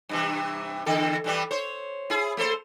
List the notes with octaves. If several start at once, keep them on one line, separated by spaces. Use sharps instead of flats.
G2 C3 E3
E2 D3 A4
G2 E3 G3
C5 C#5
E4 G#4
A3 A4 C5